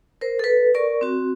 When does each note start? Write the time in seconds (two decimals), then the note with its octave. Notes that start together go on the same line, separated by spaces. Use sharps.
0.21 A#4 C5
0.39 A4 B4
0.74 A#4 D5 C#6
1.01 C4 F#4